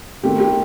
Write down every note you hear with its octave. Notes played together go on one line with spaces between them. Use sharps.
D#3 A3 C4 G4
G4